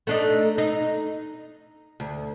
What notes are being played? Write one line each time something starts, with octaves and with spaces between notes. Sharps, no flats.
A3 D4 D#4
D#4
D2